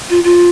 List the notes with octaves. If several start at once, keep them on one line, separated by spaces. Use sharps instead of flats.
F4
F4